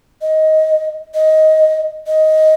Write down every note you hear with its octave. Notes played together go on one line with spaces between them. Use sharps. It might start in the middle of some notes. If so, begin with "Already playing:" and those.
D#5
D#5
D#5